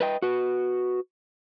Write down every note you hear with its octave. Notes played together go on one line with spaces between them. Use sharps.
B4 D#5 G5
F#4 B4